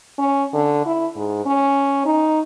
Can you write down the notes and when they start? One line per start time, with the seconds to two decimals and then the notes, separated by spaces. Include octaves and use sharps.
0.18 C#4
0.53 D3
0.86 E4
1.16 G#2
1.45 C#4
2.06 D#4